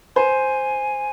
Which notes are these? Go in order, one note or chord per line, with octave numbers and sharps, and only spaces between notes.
C5 G#5